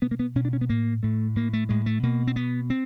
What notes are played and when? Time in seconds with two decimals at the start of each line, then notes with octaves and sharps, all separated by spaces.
0.02 B2 B3
0.11 A#3
0.19 B3
0.35 B2 C#4
0.45 D4
0.53 C#4
0.61 B3
0.69 A2 A#3
1.03 A2 A3
1.36 A2 A#3
1.53 A3
1.69 A2 G#3
1.86 A3
2.03 B2 A#3
2.27 C4
2.36 B2 B3
2.70 C4